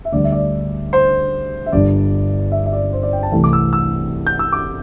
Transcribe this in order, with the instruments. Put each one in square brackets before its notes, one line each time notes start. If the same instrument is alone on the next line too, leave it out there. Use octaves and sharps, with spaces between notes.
[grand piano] E5
D2 D3 G3 D5
E5
D5
C5
E5
G1 G2 G3 D5
E5
E5
D5
C5
D5
G5
A5
C2 C3 E3 A3
D6
E6
E6
G6
E6
D6